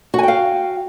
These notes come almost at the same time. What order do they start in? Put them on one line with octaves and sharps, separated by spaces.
F#4 G#5 G5 F5